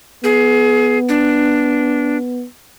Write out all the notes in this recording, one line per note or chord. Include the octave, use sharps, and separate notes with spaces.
B3 G#4
D4